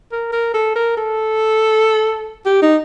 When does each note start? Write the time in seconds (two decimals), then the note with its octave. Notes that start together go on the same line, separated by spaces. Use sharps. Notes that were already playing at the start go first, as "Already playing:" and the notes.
0.12 A#4
0.32 A#4
0.54 A4
0.76 A#4
0.97 A4
2.46 G4
2.62 D#4